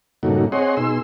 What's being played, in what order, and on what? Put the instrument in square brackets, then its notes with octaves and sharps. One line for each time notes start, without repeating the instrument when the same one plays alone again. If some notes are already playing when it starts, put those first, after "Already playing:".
[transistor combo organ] G2 A#2 C#3 A3 D#4 F#4
C4 G#4 C#5 D#5 F#5 C6
B2 D#4 G#4 C6 E6